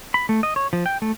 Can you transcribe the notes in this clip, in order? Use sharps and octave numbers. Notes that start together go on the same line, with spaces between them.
B5
A3
D#5
C#5
F3
G5
A3